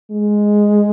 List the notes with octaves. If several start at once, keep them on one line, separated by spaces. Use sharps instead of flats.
G#3